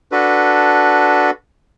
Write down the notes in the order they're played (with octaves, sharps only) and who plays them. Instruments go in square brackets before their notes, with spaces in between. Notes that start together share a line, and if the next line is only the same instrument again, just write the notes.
[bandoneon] D4 F#4 A4 B4